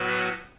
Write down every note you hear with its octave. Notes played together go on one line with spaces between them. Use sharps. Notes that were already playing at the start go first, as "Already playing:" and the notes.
Already playing: A2 F#3 B3 F#4 B4